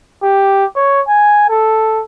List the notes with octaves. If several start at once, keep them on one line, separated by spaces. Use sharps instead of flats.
G4
C#5
G#5
A4